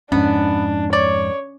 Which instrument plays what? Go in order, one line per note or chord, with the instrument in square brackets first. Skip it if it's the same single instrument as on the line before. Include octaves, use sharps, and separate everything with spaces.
[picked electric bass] F2 G#2 [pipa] B3 [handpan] C#4 [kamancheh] D4
[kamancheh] C#5 [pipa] D5